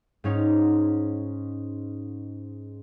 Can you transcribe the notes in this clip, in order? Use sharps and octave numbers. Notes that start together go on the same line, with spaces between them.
G#2 C#4 D#4